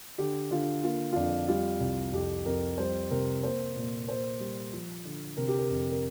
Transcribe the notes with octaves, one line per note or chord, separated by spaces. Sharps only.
D3 G4
D3 F4
A#3 F4
F4
F2 D4
G3 F4
C2
F2 G4
F2 A#4
G3 C5
C3 A#4
A#3 C5
A#2
A#3 C5
G3
F3
D3
C3 A#4
G4
A#4
F2
A#4